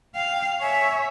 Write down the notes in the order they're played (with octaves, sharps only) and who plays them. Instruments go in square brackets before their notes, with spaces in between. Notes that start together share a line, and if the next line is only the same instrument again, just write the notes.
[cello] F5 [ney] G5
[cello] C#5 E5 [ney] G#5